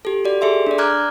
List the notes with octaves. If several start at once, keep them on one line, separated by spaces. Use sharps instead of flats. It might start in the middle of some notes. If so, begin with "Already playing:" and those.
G4 A4
F#4 G4 D5
G#4 A4 E5 C6
D4 D5
A#5 D6 F6 F#6 G#6